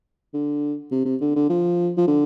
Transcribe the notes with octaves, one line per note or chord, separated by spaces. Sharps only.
D3
C3
C3
D3
D3
F3
F3
D3